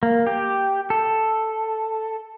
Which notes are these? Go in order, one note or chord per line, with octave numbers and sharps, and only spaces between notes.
A#3
G4
A4